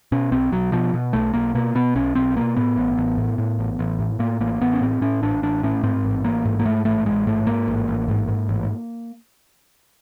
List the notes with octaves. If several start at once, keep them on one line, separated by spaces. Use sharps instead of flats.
B2 C#4
B1 C4
B1 F#3
B2 F3
B2
B1 A3
B1 A#3
B2 A#3
B2 B3
B1 C#4
B1 C4
B2 A#3
A2 B3
A1
A1
A2
A2
A1
A1
A2
A2 A#3
A1 A#3
A1 B3
C#4
A2 C4
A2 C#4
A1 D4
A1 D4
A2 C#4
G#2 C4
A1
A1 A#3
G#2
A#3
G#2 A3
A1 A3
A1 G#3
G#2 A3
G#2 A#3
A1
A1
G#2
G#2
A1